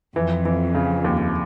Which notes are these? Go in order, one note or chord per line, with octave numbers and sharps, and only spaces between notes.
F2 E3
E3
C#3
D#2